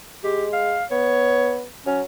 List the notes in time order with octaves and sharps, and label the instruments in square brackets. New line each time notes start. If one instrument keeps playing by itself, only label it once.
[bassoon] G#3 [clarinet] G4
[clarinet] F5
[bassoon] B3 [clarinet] C#5
[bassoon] F#3 [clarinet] C#4